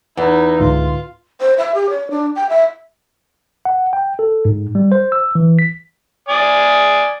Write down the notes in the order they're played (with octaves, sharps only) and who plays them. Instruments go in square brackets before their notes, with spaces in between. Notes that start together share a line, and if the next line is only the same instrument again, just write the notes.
[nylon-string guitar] E2 [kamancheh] D#4 E4
[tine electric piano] C#2 G#2 D3 [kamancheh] F4
[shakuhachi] C5
E5
G4
C#5
D4
G5
E5
[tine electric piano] F#5
G5
A4
G#2
G3
C5
E6
E3
B6
[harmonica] D5 G#5 D#6